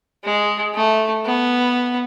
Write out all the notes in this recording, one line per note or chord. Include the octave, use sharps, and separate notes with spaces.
G#3
A3
B3